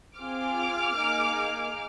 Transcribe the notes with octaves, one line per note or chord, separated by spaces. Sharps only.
C4 F4 G#4 D6 F6
A#3 D#4 G#4